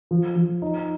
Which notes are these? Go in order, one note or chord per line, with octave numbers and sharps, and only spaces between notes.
F3
F3
D#4